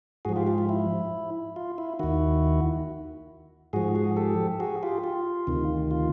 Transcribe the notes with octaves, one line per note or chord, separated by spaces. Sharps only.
G#2 F3 F#4 G#4
F4 G4
F4 G4
F4
E4
F4
E4
D#2 D#3 E4 F#4
G#2 F3 F#4 G#4
F#4 G#4
G4 A4
F#4 G#4
F4 G4
F4
D2 C3 D#3
F4